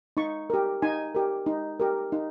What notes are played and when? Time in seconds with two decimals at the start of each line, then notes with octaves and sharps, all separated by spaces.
0.17 D#4 C#6
0.50 G4 A#4
0.82 D#4 G#5
1.15 G4 A#4
1.46 D#4
1.80 G4 A#4
2.12 D#4